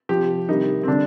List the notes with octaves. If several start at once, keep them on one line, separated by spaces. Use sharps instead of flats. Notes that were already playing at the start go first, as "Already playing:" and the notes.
C3 F3 G4
C3 D#3 G3 D#4
C4
D3 G3 D4